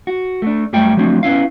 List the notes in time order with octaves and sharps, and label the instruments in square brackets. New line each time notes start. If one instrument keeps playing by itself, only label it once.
[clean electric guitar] F#4
A3 D4
F#2 G3 A3 G5
F3 F#3 A3 C4 D4
B3 C#4 E4 F5